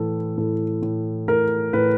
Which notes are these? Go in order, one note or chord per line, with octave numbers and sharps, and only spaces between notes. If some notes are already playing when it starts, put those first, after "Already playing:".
Already playing: A2 E3 A4
A2 A4
A2
A2 A#4
A2 B4